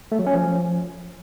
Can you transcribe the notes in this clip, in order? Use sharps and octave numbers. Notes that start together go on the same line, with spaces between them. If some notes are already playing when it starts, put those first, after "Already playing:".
A3
F#3
C#4
F3